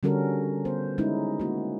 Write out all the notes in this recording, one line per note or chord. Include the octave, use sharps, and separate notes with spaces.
D3 G3 C#4 F#4 A4 A#4
B3 C5
G#3 C#4 D#4 E4
A#3 F#4